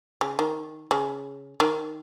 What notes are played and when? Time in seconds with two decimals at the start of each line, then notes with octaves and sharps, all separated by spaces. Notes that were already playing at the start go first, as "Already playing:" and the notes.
0.21 C#3
0.39 D#3
0.91 C#3
1.60 D#3